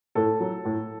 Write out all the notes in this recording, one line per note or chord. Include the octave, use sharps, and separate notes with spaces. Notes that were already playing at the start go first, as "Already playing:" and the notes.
A2 A4
F#3
A2